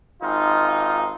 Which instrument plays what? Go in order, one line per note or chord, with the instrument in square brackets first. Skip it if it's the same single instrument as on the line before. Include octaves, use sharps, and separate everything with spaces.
[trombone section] G#1 D#4 F4